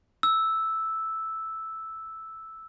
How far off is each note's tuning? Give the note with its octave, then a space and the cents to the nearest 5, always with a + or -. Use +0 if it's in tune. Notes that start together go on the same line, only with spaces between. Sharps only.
E6 -5